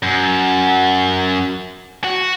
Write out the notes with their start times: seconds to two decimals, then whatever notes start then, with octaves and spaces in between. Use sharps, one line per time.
0.03 F#2
2.04 F#4